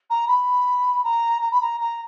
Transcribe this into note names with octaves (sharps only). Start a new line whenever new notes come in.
A#5
B5
A#5
A#5
B5
A#5
A#5